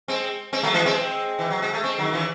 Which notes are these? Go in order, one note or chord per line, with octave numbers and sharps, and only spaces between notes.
G#3 C4
G#3 C4
F#3 A3
E3 G#3
G#3 C4
E3
F#3
G#3
A3
G#3 C4
D#3 F#3
C#3 E3